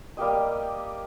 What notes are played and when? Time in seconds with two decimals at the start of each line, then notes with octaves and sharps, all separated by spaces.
0.17 G3 A#3 G4 D#5